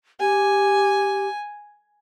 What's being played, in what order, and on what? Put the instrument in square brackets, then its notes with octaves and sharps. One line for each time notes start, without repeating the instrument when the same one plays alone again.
[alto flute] G4 [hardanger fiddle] G#5